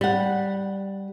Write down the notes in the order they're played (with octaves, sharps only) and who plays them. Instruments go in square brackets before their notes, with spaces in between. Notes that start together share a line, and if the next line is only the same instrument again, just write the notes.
[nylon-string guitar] G3 F#5